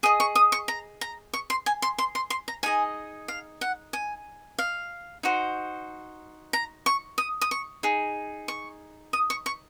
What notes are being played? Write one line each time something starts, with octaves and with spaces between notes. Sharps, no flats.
G#4 D#5 D#6
C#6
D#6
C#6
A#5
A#5
C#6
C6
G#5
C6
C6
C6
C6
A#5
D#4 G#4 D#5 G#5
F5
F#5
G#5
F5
D#4 F#4 C5
A#5
C#6
D#6
D#6
C#6
D#4 G#4
C#6
D#6
C#6
C#6